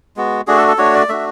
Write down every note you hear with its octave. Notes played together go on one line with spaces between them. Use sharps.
G#3 B3 F#4
A3 D4 F#4 G#4
A4
A4
A3 D4 F#4 C#5
D5
A3 D4 F#4 E5